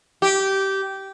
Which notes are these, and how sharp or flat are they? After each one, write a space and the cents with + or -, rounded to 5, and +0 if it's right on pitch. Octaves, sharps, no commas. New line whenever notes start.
G4 -15